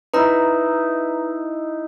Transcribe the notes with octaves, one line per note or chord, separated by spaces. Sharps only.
D#4 E4 B4 A#5